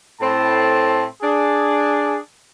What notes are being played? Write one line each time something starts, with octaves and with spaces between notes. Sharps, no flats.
A2 C4 A5
D4 G#4